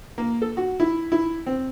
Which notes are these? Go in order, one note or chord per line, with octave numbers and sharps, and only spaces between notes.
A#3
A4
F#4
E4
E4
C4